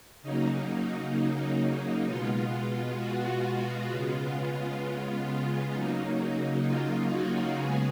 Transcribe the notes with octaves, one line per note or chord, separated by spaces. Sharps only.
C#3 F#3 A#3 D#4
B2 G#3 B3 F4
F#4
C#3 G#3 B3 F4
C#3 F#3 A#3 D#4
F4
F#4
C#3 G#3 B3 G#4